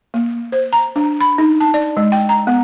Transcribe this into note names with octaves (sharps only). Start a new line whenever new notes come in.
A#3
C5
A#5
D4
B5
D#4
A5
D5
G#3
G5
A#5
B3